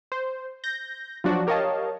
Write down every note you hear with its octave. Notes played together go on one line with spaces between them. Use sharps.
C5
G6 A#6
F3 F#3 D4 F#4 D5
G4 A#4 C#5 D#5 F5 A5